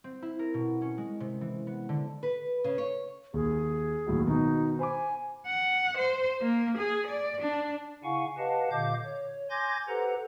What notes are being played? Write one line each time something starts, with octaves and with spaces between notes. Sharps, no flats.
C4
E4
A#4
B2
C#4
G#3
C3
E3
B3
D3
B4
C#3
C#5
D#2 G#4
D#2 A2 F#3
B2 D#3 D#4
C5 G#5 B5 D6
F#5
C5
A#3
G#4
D5
D4
C#3 E4 F5 F#5 G#5 C#6
G4 B4 D#5 F5 F#5 A5
A#2 D3 D#5 F5 D6 G6
C#5
G#5 C6 D6 G6 G#6 A#6
G4 A4 B4 C5 F#5 A#5